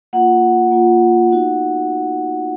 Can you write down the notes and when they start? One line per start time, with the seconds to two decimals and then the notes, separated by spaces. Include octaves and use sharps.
0.13 A#3 F4 F#5
0.71 A#3 F4
1.31 B3 D#4 F#4